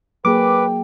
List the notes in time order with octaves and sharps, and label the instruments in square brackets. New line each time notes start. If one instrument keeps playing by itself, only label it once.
[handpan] F#3 A#3 G#4 [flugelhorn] B4 [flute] G5 [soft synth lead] D6